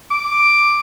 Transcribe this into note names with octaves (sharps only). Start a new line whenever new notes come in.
D6